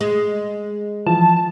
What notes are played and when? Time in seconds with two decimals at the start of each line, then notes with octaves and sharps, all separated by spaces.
0.01 G#3
1.07 E3 F3 A5